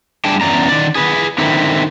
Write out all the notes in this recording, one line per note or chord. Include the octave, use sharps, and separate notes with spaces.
G3 A3 D4 G#4 G5 A5
E2 C#4 D5 A#5
D#3 D5
G#4 B4
D3 D#3 C4 E4